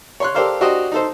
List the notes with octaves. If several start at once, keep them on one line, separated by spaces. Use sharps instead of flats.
C#5 C6 F#6
G4 A4 A#4 C5 D5 F5
D4 F#4 G4 C5 D#5
D#4 A4 C5